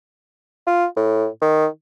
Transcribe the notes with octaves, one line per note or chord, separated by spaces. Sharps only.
F4
A2
D#3